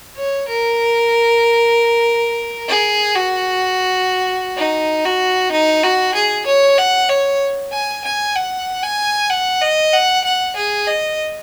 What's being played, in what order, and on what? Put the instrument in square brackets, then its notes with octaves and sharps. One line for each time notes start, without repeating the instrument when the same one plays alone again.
[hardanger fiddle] C#5
A#4
G#4
F#4
D#4
F#4
D#4
F#4
G#4
C#5
F#5
C#5
G#5
G#5
F#5
G#5
F#5
D#5
F#5
F#5
G#4
D#5